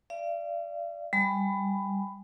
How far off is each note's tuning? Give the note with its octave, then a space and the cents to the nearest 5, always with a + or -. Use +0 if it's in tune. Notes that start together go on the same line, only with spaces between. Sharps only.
D5 +0 F5 -45
G3 +0 G#5 +0 B5 +10